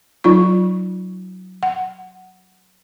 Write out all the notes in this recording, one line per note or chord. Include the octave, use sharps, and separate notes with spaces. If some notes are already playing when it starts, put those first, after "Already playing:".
F#3 D#4 F4 C#6
F#5